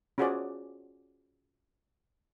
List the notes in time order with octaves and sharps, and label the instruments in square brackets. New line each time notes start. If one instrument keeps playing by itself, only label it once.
[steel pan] C#4 F4 F#4 G#4 C5 D5